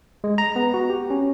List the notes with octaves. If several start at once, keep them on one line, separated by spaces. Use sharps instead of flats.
G#3
A#5
B3
F#4
G4
C#4